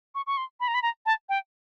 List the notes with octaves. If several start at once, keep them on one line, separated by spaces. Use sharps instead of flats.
C#6
C#6
C6
B5
A#5
B5
A#5
A5
G5